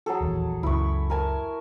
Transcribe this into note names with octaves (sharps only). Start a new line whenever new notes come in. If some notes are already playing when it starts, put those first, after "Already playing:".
F#3 G#4 A4
D#1 A#1 E2
C#2 F#2 E4 B5 C#6
A#4 G#5 A5